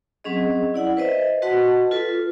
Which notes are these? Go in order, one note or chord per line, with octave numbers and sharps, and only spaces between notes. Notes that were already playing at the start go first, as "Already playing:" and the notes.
F#3 C4 C#4 G#4 D#5
E4 D5 F#5
B4 C5 D#5 E5
F#4 B4 D#5 F#5 A5 C6
F4 A4 B4